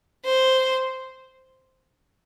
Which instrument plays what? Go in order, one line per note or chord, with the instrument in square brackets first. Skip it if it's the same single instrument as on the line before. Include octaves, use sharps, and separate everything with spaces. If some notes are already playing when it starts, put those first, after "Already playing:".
[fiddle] C5